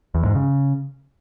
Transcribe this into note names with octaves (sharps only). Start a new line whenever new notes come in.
E2
G#2
C#3